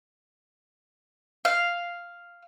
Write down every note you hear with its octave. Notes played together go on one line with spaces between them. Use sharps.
F5